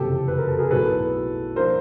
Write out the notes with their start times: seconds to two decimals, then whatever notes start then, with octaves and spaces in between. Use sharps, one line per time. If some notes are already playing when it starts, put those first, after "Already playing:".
Already playing: F#1 F2 C3 E3 G4 A4
0.28 B4
0.38 A#4
0.48 A4
0.59 G#4 A#4
0.71 B1 A2 F#3 A4 B4
1.56 F3 A#3 D4 F4 A#4 C5